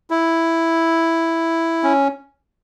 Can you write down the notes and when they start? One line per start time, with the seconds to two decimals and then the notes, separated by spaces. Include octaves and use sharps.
0.10 E4
1.83 C#4